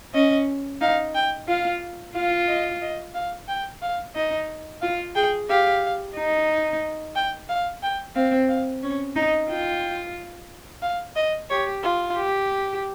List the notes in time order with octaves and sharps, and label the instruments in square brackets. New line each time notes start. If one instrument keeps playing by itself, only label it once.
[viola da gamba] C#4 [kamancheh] D#5
[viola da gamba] D#4 [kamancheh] F5
[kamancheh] G5
[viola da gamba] F4 [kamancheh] F5
[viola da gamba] F4 [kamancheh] F5
[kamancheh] D#5
D#5
F5
G5
F5
[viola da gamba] D#4 [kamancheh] D#5
[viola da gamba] F4 [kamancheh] F5
[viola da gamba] G#4 [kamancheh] G5
[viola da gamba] G4 [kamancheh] F5
[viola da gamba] D#4
[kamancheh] G5
F5
G5
[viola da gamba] C4 [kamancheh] F5
[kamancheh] F5
[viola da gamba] C#4 [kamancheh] C#5
[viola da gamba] D#4 [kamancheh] D#5
[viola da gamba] F4 [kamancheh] G5
[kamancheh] F5
D#5
[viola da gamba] G4 [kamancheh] C#5
[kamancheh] F4
[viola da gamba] G4